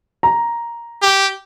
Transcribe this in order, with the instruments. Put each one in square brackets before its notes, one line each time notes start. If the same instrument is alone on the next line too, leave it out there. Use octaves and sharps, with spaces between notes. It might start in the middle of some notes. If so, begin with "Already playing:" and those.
[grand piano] A#5
[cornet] G4